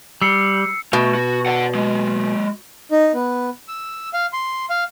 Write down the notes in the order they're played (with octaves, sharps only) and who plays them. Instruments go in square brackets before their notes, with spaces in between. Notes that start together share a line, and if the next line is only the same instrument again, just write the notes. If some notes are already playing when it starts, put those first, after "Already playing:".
[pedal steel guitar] G3 [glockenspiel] E6 C7 C#7
[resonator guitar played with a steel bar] B2 [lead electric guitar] A3
[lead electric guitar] F#4
D5 F#5
G#3 A#3
[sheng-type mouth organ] D#4
B3
E6
F5
C6
F5